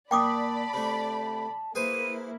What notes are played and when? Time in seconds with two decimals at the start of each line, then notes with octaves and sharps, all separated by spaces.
0.11 A#2 D5 G5 A5 B5 D6 D#6
0.74 C3 A3
1.75 A#3 E4 G#4 B4 C5 D#7